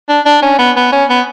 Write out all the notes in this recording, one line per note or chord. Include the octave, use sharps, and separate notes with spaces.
D4
D4
C#4
B3
B3
C#4
B3